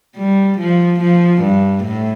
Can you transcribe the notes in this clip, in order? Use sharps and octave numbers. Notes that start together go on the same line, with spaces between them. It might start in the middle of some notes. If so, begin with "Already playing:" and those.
G3
F3
F3
G2
A2